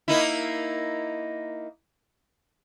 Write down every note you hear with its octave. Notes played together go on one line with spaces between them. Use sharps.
A#3 D#4 E4